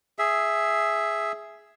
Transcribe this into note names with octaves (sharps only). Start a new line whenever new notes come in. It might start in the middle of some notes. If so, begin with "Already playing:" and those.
G#4 E5